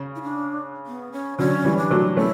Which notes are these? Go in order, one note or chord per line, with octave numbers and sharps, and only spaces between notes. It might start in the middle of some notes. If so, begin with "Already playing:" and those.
Already playing: C#3
E4
D4
B3
C#4
D3 F#3 C#4
E3 G3
D4
F#3 A3
A3 C#4 E4